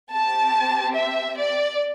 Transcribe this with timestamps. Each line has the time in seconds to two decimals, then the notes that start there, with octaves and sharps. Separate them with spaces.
0.11 C4 G4 A5
0.96 E5
1.39 D5